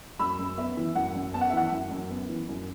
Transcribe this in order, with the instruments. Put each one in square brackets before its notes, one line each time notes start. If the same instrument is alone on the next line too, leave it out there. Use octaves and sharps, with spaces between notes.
[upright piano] F#2 B5 E6
F#2
B3 E5
E3
F#2 F#5
F#2
B3 A5
F#5
E5
E3 F#5
F#2
F#2
B3
E3
F#2